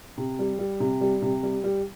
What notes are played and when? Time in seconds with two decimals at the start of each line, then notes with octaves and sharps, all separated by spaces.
0.17 C3
0.39 G3
0.59 G3
0.80 C3
1.01 G3
1.22 C3
1.43 G3
1.64 G3